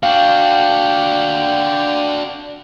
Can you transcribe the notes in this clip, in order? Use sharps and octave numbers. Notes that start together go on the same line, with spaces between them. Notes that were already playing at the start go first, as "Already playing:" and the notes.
D4 F#4 F5 G5